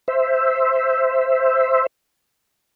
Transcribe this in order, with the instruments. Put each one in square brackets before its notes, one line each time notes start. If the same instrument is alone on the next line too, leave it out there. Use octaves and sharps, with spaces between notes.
[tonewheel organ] C5 E5